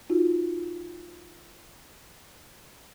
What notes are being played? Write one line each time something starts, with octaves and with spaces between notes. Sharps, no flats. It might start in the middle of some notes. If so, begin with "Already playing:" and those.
D#4 F4 F#4